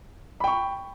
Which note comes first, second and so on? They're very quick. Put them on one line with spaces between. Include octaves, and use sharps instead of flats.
B5 G5 C#6